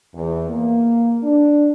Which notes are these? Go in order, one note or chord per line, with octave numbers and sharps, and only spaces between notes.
E2
A#3
D4